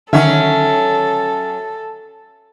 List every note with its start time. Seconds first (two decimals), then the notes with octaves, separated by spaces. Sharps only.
0.13 D3 D#3 F#3 C#4 A4 E5